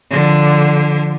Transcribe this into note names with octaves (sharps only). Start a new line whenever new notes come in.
D3 F3